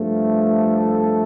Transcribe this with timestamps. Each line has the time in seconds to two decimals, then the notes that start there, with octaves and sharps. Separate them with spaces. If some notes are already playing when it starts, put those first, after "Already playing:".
Already playing: G2 F3 A3
0.32 A4